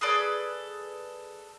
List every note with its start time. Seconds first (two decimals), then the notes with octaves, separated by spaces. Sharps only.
0.01 G#4 A4 B4 D5